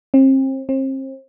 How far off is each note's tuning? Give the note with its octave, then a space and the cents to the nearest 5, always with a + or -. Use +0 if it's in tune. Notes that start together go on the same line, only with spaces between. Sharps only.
C4 +35
C4 +35